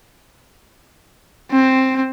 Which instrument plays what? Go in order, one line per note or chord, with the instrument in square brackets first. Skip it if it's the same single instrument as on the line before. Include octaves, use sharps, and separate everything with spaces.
[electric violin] C4